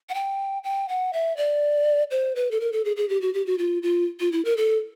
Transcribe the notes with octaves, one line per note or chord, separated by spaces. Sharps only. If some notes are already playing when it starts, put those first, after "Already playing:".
F#5
G5
G5
F#5
E5
D5
C5
B4
A4
A#4
A4
G#4
G#4
G4
F#4
G4
F#4
F4
F4
F4
E4
A#4
A4